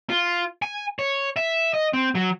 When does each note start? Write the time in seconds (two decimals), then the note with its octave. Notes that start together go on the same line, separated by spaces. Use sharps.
0.10 F4
0.62 G#5
0.99 C#5
1.36 E5
1.74 D#5
1.93 C4
2.15 F#3